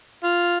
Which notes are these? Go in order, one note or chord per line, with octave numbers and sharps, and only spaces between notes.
F4